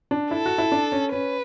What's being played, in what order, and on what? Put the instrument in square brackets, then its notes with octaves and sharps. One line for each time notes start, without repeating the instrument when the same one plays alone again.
[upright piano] D4
[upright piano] E4 [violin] A4
[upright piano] F#4
E4
D4
C#4
[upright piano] C#4 [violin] B4